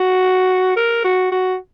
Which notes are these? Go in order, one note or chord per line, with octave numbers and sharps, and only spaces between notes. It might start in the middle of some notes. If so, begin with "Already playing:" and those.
Already playing: F#4
A#4
F#4
F#4